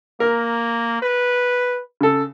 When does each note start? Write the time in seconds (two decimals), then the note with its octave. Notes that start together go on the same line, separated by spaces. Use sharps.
0.20 A#3 A#4
1.02 B4
2.01 C#3 A4